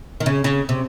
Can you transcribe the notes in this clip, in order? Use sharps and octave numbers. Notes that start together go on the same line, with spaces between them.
D#3
C#3
C#3
C3